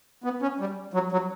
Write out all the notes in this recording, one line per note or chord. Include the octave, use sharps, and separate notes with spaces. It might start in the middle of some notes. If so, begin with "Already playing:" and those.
B3
C#4
G3
F#3
F#3